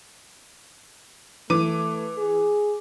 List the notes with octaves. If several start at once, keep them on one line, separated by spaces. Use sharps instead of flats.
E3 A3 D6 D#7
G#4